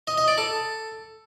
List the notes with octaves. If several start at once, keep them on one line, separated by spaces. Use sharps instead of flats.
D#5
D#5
D5
A4